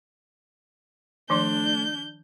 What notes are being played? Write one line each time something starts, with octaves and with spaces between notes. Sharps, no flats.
D#3 F3 A3 D4 C6 G6